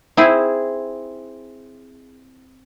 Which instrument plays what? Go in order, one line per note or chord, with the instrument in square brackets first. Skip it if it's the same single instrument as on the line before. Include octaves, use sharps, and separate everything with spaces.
[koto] C4 E4 G#4